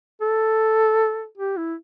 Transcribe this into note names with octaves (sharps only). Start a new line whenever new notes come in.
A4
G4
E4